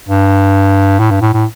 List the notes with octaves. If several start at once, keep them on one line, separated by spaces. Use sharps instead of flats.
G2
A2
G2
A2
A2